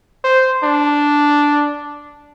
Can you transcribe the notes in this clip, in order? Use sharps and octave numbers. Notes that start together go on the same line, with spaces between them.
C5
D4